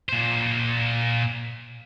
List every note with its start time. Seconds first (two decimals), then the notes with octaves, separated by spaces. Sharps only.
0.09 A#2 C5